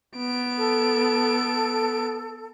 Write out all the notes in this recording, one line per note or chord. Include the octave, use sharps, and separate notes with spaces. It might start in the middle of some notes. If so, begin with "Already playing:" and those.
B3 D7
A4